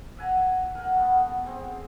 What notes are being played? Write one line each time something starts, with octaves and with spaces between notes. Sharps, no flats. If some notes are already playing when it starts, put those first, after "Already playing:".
E5 F#5 G#5 A#5
A#4 F#5
A3 B3
C4 G#4